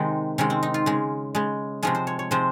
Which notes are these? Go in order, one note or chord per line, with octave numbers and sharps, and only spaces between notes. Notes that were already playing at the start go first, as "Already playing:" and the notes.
Already playing: C3 D#3 G#3 D#4
C3 D#3 G#3 C#4
C4
D#4
F4
C#3 G#3
C#3 G#3
C3 F3 G#3 C#4
C5
C#5
C#5
C3 F3 G#3 C5